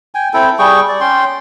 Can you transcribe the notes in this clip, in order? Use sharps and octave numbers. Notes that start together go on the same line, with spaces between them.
G5 G#5
C4 E4 A4 G5
G3 G#4 G5 C#6
D5
C#4 G5 C6